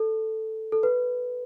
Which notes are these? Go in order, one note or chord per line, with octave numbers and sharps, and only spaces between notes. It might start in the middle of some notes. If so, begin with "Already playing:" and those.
Already playing: A4
A4
B4